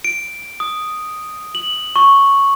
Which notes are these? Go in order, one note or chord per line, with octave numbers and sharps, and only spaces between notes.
D7
D#6
F#7
C#6